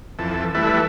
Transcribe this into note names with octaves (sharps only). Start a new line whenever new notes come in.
F2 E3 A4
E3 G3 A3 E4 A4 B4